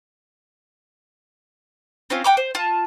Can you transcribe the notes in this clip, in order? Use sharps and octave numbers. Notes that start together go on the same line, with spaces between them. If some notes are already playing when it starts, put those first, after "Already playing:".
C4 C#4 F4
F#5 G5 A#5 D6
C5
F4 A5